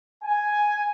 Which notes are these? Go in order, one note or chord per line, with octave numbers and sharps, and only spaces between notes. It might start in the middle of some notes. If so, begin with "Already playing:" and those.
G#5